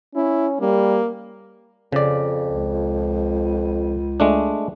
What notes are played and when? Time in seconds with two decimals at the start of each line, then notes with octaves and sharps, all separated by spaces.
0.15 C#4 E4
0.61 G3 A#3
1.93 F2 C#3 D5
2.47 C#2
4.20 G#3 A3 D4